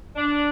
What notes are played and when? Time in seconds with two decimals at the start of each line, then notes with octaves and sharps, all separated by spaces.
0.15 D4